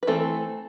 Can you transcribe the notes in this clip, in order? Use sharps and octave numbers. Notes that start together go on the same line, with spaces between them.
B4
E3 A3 C4 A4